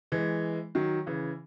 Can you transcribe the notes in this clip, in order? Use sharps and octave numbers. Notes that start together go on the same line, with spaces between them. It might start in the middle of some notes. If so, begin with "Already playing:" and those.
E3 G#3
D#3 F#3
C#3 E3